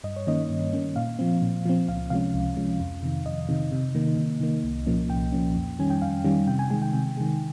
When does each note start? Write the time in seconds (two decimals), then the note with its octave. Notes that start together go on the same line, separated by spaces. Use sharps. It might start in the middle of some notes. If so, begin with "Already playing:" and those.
0.04 G2 D#5
0.16 C#5
0.27 D#3 A#3 C#4 D#5
0.50 G2
0.73 D#3 A#3 C#4
0.96 A#2 F5
1.19 F3 C4
1.42 A#2
1.66 F3 C4
1.88 C#2 F5
2.10 C3 F3 G#3 C#4 F5
2.34 C#2
2.57 C3 F3 G#3 C#4
2.80 F2
3.03 C3 D#3
3.26 F2 D#5
3.49 C3 D#3
3.72 C3
3.95 D#3 A#3
4.17 C3
4.41 D#3 A#3
4.64 C2
4.86 A#2 F3 A#3 C#4
5.09 C2 G5
5.32 A#2 F3 A#3 C#4
5.55 F2
5.79 D#3 G3 C#4 G#5
5.90 G5
6.02 F2 F5
6.24 D#3 G3 C#4
6.47 C3 G5
6.59 G#5
6.70 D#3 G#3 G#5
6.82 G5
6.93 C3
7.17 D#3 G#3